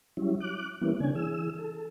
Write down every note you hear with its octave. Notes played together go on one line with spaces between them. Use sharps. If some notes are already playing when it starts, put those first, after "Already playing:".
F#3 G3 C#4 E4
D6 F#6
E3 G3 A#3 B3 C#4 E4
C#3 C#4 D4 G#5
E3 G#4 E6
A4